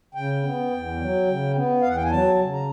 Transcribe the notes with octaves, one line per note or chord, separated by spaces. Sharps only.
C#3 G5
B3
E2
F#3
C#3
B3
E2 F5
F#5
G5
G#5
F#3 A5
C#3
A#5